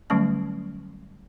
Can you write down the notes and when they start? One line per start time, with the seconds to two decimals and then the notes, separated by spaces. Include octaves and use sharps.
0.10 D3 F#3 G3 A3 C#4 A5